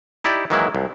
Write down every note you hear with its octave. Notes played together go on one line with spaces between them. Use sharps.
D#4 E4 G4 D5
D#3 E3 F#3 G#3 A#3 E4
C2